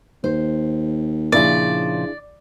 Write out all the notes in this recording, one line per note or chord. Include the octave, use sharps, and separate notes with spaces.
D#2 C5
A#2 C#3 F3 D4 E4 G#4 D5